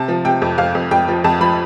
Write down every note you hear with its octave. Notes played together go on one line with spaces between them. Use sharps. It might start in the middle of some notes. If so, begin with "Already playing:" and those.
Already playing: C3 A5
F3
C3 G5
F2
F2 F5
F2
F2 G5
F3
F2 A5
F3 B5